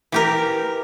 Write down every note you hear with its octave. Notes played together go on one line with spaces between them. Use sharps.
E3 G4 A#4